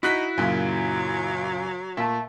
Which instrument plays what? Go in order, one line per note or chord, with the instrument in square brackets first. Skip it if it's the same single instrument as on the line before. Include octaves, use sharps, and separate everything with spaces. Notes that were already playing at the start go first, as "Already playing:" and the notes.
[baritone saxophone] D#4 [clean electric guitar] E4 [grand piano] F#4 F#6 B6
[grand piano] F#2 A#2 C#3 [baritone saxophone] F#3
[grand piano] A#2 [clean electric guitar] E5 A5